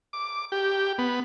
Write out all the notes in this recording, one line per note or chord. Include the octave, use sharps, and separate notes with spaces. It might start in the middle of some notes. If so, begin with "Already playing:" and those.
D6
G4
B3